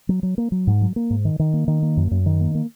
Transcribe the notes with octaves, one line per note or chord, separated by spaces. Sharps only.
F#3
F#3
A#3
F#3
G#2
F#3
A#3
G#2
D#3
D#3
A#3
D#3
A#3
F#2
F#2
D#3
A#3
A#3